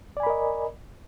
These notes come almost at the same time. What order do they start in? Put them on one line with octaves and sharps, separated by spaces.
D5 G#5 B5 A#4 D#5